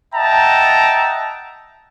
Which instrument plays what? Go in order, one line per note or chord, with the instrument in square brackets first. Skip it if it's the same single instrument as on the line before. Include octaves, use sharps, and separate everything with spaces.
[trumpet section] D#5 E5 F#5 G5 A5 A#5